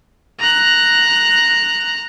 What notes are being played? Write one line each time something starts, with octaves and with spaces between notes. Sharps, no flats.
A#5 F#6